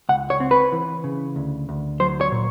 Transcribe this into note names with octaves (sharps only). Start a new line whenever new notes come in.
C#2 F#5
C#5
C4
B4
E3
C#3
D2
D2
F#3 C5
C#5
A#2